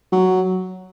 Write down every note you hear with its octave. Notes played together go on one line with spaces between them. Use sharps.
F#3